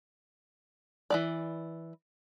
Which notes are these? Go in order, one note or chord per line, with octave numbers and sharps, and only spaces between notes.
E3 F#3 D5